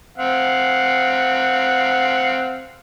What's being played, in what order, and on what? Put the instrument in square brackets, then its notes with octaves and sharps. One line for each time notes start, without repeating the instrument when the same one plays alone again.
[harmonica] C4 F5 F#5